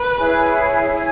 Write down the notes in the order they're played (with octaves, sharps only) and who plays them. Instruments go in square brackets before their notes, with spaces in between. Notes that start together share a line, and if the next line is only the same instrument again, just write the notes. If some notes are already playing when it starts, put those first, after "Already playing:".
Already playing: [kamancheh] B4
[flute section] E4 G#4 C#5 G#5
E4 G#4 C#5 G#5